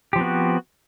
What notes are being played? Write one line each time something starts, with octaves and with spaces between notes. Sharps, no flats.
F3 B3 C4 F#4 G4